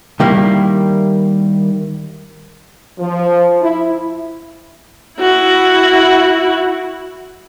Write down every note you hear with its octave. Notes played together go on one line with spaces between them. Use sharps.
D#3 G3 A#3 E4
F3
E4
E4 F#4